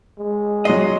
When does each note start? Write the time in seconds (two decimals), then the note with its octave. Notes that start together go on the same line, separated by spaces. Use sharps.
0.18 G#3
0.65 F#3 D#5 C6 C7